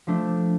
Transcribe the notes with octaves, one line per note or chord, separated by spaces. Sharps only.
F3 A3 D4